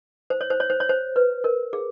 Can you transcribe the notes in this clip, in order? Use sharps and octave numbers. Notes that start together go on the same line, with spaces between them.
C5
C#5
C5
C#5
C5
C#5
C5
B4
A#4
G#4